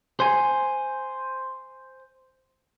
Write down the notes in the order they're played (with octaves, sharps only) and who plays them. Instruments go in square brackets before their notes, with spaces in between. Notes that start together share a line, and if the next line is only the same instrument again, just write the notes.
[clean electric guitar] C5 G#5